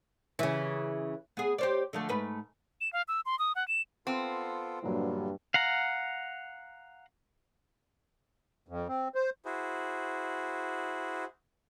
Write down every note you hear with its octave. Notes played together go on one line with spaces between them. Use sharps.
C#3 E3
B3 G#4
G4 C5 D5
D3 F3 A3
G#2 A3 B4
E7
F5
E6
C6
D#6
F#5
E7
B3 C4 F4 A4
A#1 E2 G2 D3 F#3 G3
F5 F#5 A#5
F2
C4
C5
E4 F#4 G#4 C5